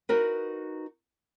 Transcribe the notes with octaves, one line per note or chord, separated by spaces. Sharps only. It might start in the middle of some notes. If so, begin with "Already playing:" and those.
D#4 F#4 A#4 B4